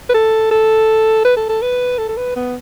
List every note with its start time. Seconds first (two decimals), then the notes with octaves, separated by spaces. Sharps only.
0.09 B4
0.14 A4
0.51 A4
1.25 B4
1.36 A4
1.49 A4
1.62 B4
1.98 A4
2.09 A4
2.17 B4
2.36 B3